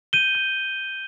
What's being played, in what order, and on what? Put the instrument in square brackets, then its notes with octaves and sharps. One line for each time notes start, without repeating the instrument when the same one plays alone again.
[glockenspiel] G6 D#7 G7
G6